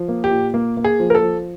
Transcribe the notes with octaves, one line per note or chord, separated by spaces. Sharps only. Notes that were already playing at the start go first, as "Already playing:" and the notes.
Already playing: F3
A#3
G4
A#2
A#3
A#3
G#4
F3
A#4
A4
F3